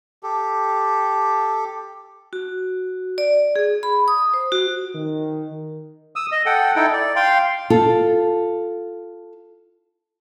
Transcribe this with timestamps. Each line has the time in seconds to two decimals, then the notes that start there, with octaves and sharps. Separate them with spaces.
0.23 G4 A4
2.33 F#4
3.18 D5
3.56 G#4
3.83 B5
4.08 D#6
4.34 C5
4.52 F#4
4.95 D#3
6.16 D#6 E6
6.32 D#5
6.46 A4 F#5 G5
6.76 D#4 E4 A4 G5
6.93 D5
7.16 F5 G5 C6
7.70 F4 A4